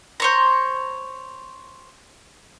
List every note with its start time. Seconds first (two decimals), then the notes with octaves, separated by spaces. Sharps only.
0.20 C5 C#5 A#5